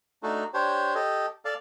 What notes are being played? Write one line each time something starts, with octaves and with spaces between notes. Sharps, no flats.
A3 D4 D#4 F#4 A4
D4 G4 C5 C#5
G4 A4 D#5
A4 D5 F5 A5